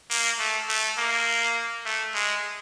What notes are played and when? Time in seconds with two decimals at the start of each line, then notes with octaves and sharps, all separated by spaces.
0.10 A#3
0.39 A3
0.69 A3
0.98 A#3
1.85 A3
2.14 G#3